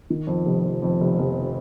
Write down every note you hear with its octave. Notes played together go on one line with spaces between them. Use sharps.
D#3
F2
F1
F2
F2
F1
F1